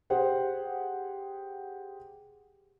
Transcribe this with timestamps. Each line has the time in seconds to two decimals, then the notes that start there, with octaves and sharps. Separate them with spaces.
0.10 G4 G#4 C5 F#5 G5